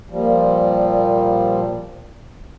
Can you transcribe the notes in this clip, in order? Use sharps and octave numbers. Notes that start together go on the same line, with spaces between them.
A#2 F3 G3